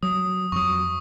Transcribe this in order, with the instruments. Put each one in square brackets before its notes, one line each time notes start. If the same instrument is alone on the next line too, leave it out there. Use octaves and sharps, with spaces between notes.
[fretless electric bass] F#3 [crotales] D#6
[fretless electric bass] F2 F#3 [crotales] C#6 D#6